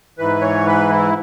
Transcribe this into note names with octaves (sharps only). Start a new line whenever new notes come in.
G#2 E3 B4
C#5
B4
E4